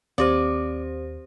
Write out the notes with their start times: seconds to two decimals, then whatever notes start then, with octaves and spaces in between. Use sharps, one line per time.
0.18 D#2 C4 G4 C5 D5